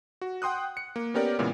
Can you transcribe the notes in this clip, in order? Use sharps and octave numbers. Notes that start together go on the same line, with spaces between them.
F#4
F#5 G5 C6 D#6 F#6
C#7
A#3
B3 C#4 G4 A#4 D5
A#2 C#3 E3 G#3 B3